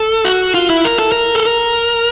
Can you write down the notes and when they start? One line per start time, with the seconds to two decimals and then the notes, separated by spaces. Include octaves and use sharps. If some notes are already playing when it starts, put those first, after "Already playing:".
Already playing: A4
0.25 F#4
0.55 F4
0.70 E4
0.85 A#4
0.99 A4
1.12 A#4
1.35 A4
1.45 A#4